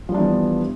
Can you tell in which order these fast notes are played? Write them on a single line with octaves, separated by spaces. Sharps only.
F3 G3 D4 E3 B3